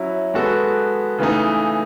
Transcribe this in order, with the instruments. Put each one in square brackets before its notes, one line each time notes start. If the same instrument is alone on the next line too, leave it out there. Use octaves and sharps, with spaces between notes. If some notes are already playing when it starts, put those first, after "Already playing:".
Already playing: [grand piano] F#3 C#4 E4
G#3 B3 F#4 A4
C#3 E3 A3 D#4